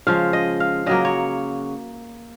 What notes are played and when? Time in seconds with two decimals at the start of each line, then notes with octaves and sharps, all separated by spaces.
0.07 C#3 F3 G#3 F5
0.33 D#5
0.60 F5
0.86 C#3 F#3 A#3 D#5
1.05 C#5